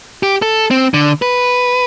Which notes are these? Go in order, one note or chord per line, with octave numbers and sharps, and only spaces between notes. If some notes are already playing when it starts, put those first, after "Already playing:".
G4
A4
C4
D3
B4